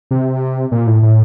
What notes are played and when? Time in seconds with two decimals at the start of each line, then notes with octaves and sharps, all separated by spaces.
0.11 C3
0.71 A#2
0.87 A2
1.03 A2